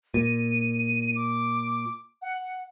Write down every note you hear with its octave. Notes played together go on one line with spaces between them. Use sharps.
A#2 D#7
D6
F#5